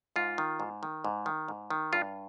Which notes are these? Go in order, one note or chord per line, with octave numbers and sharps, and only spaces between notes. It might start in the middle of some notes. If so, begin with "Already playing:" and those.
G#2 F4
D#3
G#2
D#3
G#2
D#3
G#2
D#3
G2 F4